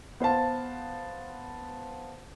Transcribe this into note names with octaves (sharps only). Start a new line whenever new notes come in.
B3 C5 F5 A5